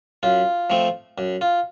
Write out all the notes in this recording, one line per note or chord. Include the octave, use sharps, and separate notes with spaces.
F#2 F4
F3 A3 C4
F#2
F4